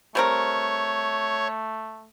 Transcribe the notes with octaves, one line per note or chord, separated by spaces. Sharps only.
G3 A3 C4 A#4 C#5